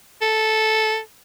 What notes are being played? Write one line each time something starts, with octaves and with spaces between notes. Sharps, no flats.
A4